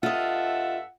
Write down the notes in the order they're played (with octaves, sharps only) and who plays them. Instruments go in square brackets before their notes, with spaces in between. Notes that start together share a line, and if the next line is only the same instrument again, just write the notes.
[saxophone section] G2 A4 E5 [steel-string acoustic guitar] F4 D#5 [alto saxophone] F#5